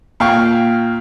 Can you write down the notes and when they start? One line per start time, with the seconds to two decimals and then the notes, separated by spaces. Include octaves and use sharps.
0.20 A#2 F5 G5 C#6